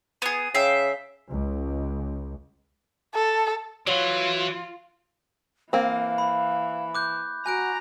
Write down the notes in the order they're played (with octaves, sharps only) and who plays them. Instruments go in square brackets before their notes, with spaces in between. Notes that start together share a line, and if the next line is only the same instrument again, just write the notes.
[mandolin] B3 G#4
[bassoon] C#3 [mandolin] E5 F5 G5
[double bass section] C#2
[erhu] A4
[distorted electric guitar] E3 [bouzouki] F#3 [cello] F4
[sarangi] E3 [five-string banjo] A#3 C4 [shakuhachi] F5
[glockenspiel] B5
D6 F#6 G6
[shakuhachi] F#4 [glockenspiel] G#5 F#6 D7 [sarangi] A#5